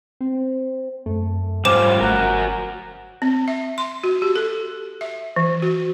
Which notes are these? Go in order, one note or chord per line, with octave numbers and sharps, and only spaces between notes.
C4
F#2 A3
G#2 G3 C#4 F4 C5 D6 E7
G1 F#4 A#4
C4
E5
C6
F#4
G4
A4
E5
E3
F#4